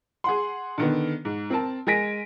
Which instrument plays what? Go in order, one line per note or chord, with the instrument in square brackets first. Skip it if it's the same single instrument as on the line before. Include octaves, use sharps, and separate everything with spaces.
[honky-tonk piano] G#4 F#5 C6
D3 D#3 B3
G#2
C4 A#4 A5
G#3 A#4 G#5 A#6 B6 D7